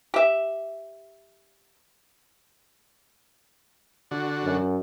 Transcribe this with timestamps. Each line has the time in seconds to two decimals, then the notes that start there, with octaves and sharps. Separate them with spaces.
0.14 G4 E5
4.11 D3 F#4
4.44 F#2